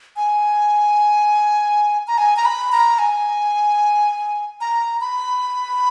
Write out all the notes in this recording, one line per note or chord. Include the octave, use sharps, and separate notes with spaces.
G#5
A#5
G#5
A#5
B5
A#5
G#5
A#5
B5